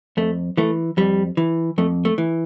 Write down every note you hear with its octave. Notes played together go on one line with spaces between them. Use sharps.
F2 A3
E3 A3
F2 G3
E3
F2 A3
A3
E3